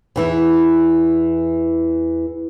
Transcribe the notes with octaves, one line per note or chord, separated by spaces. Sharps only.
E2 E3 E4